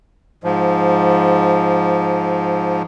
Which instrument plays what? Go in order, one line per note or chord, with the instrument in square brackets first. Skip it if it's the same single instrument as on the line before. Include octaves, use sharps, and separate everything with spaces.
[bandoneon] G#2 F3